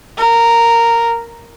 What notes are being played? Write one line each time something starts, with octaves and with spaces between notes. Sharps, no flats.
A#4